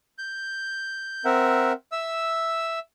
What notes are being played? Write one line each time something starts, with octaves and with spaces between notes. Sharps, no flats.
G6
C4 A#4 E5 F#5
E5 E6